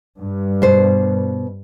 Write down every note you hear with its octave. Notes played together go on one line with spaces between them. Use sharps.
G2
B2 C5